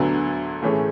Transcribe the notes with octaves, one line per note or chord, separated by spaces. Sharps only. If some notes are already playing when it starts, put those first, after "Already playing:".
Already playing: D2 D3 F#3 B3
A2 E3 A3 C#4 G#4